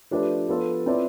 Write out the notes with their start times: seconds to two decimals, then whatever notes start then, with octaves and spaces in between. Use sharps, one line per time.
0.11 F3 A3 D4 G4 B4
0.48 F3 B3 F4 A4
0.86 F3 C4 E4 B4 D5